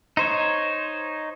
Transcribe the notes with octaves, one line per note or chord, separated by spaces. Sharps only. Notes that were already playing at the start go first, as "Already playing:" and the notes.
D#4 C5 C#5